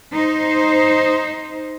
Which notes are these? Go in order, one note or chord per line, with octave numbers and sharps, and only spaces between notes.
D#4 C5